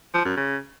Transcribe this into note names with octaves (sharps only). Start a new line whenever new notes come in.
F3
F#2
C#3